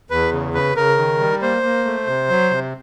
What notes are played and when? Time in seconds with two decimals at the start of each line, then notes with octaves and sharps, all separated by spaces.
0.11 E2 B4
0.32 C#3
0.54 C#3 B4
0.76 C#3 A#4
0.98 D#3
1.20 G3
1.42 A#3 C5
1.63 A#3
1.85 A3
2.07 C3
2.29 F#3
2.51 C3